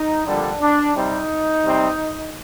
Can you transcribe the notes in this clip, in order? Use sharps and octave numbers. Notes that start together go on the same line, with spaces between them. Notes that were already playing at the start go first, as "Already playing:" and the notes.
Already playing: D#4
F2 D3 G3 A#3 D4
D4
C3 G3 C4 D#4
C3 G3 C4